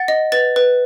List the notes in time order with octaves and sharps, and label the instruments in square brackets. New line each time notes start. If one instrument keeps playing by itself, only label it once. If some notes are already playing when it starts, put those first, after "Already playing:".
Already playing: [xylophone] F#5 A6
D#5
B4 A6
B4